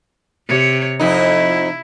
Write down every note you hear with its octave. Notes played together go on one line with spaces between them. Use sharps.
C3 C#5
F2 D#4 E4